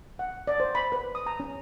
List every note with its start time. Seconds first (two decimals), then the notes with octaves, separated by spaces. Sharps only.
0.19 F#5
0.47 D5
0.60 C5
0.75 B5
0.92 B4
1.15 D#6
1.27 A#5
1.40 C#4